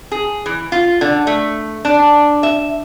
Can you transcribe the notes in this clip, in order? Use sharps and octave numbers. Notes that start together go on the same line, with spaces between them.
G#4
E3
F4
D3
A3
D4
E5